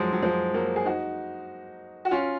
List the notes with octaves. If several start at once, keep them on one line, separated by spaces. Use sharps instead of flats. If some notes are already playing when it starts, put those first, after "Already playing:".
Already playing: F3 F#3 G#3
F#3
F3 G#3
F#3 A#3
G#4
D#4 F#4
F#4
C#4 F4